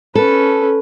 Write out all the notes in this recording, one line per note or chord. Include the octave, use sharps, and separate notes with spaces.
C#4 A4 B4